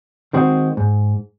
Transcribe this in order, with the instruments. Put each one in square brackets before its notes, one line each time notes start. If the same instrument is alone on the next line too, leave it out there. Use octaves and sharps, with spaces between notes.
[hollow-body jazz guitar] D#3 G#3 C4 F#4
G#2